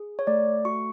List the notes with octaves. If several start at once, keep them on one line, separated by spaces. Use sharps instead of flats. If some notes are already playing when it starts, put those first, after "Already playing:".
Already playing: G#4
C#5
A3 D5
F#4 C#6